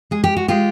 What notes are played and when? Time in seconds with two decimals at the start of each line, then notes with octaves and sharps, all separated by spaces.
0.11 G#3 G#4
0.24 G4
0.37 F#4
0.48 G#3 F4 G4